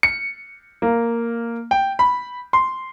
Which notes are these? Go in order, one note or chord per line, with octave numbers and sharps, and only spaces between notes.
C#7
A#3
G5
B5
C6